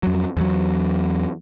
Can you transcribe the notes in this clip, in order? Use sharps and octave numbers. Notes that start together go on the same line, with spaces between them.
F2 F#3
E2 F#3